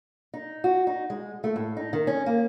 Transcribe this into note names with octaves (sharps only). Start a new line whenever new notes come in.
D#4
F#4
D#4
G#3
A3
A2
D#4
D#3
C#4
A#3